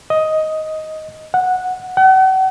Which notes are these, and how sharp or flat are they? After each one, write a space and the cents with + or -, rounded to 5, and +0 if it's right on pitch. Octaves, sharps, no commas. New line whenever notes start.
D#5 +10
F#5 -10
F#5 +40